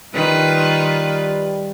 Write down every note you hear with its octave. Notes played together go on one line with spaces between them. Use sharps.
D#3 G3 F4 B4